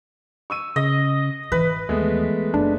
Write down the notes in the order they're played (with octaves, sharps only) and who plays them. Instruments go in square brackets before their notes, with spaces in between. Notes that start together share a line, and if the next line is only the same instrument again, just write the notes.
[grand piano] C#6 E6 D#7
[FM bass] C#3 [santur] D#5
[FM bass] G#1 [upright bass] E3 [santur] B4
[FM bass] D#2 [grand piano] G#3 A3 B3
[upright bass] F#1 [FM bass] D4